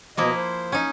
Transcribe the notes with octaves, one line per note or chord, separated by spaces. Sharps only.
B2 F3 A#3 E4 D#5
C5
C#4 D#4